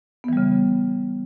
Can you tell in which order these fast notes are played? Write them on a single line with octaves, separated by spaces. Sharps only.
B3 E3 G3 C#3